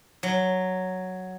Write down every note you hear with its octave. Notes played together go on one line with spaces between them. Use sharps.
F#3